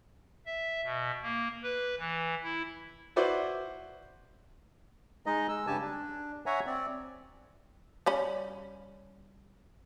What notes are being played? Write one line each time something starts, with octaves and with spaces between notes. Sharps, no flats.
E5
B2
A#3
B4
E3
E4
E4 F#4 B4 C5 D5
G#3 D#4 D#5
G#3 E6
G2 C#3 G4 G#5 A5
D4
C#5 E5 F#5 G#5 A#5
C4 D5
G3 C#4 B5